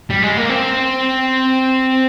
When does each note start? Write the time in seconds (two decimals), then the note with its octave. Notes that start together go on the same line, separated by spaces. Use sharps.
0.10 G3
0.22 G#3
0.37 A#3
0.49 C4